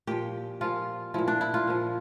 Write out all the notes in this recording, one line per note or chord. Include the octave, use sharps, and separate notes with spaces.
A#2 F3 G4
A#2 F3 F4
A#2 F3 E4
D4
E4
F4
A#2 F3